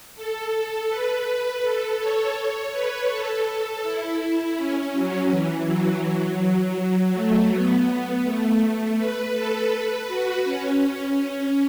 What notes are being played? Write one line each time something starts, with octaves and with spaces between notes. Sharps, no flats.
A4
B4
A4
C#5
B4
A4
E4
C#4
F#3
E3
F#3
F#3
A3
B3
A3
B4
A4
B4
F#4
C#4
C#4
C#4